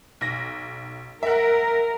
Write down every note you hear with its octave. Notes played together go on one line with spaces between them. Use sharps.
B1 A#6
A#4 E5 F#5